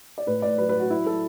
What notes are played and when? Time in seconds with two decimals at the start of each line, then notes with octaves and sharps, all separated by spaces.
0.18 D5
0.27 A2 B4
0.42 A2 D5
0.58 F#3 B4
0.69 B4
0.74 F#3
0.80 F#4
0.90 F#3 E4
1.06 F#3 A4